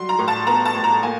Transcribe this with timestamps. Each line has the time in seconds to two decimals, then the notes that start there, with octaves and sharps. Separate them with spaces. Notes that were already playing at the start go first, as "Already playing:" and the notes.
Already playing: F#3 G3 C6
0.09 A#5
0.19 A2
0.28 A5
0.47 B3 A#5
0.65 A5
0.74 A2
0.84 A#5
1.03 A#3 G#5